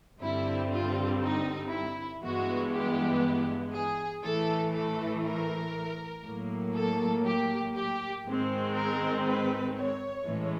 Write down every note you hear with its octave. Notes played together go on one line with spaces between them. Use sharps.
G2 D3 G3 C4 E4
F4
D#4
E4
G2 E3 G#3 B3 F#4
G4
G#4
A2 E3 A3 A4
A4
A#4
A2 F#3 A#3
A4
G4
G4
G#2 D#3 G#3 C4
A#4
B4
C#5
A2 E3 G#3 C#4